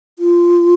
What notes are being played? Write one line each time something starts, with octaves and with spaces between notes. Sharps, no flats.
F4